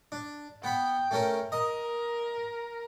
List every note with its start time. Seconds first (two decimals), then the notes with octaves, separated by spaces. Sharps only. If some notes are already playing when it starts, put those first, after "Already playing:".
0.12 D4
0.64 B3 G5 B5
1.11 A3 C#4 A#4
1.52 A#4 D#5